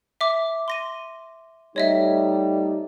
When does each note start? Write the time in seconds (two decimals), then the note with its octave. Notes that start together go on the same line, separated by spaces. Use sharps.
0.21 E5 D6
0.68 C6 A#6 D#7
1.76 G3 A3 D#4 C#5 D#5 E5